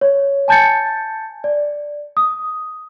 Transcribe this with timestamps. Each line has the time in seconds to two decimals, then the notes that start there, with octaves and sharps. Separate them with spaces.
0.01 C#5
0.48 G#5 A5 G6 A6 C#7
1.44 D5
2.17 D#6